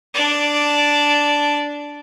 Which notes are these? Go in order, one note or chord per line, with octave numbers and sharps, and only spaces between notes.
D4 D5